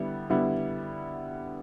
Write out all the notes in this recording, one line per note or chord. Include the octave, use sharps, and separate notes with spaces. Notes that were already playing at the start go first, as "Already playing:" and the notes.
Already playing: D3 G3 B3 E4
D3 G3 B3 E4